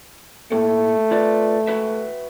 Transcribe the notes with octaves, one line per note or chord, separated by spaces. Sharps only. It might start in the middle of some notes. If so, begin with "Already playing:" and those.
A2 A3 A#3 A4
F4 B4 D5
F#4 B4 E5